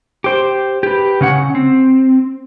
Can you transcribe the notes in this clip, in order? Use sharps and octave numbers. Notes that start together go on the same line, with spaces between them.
G4 C5
G4 B4
C#3 C#4 F#5
C4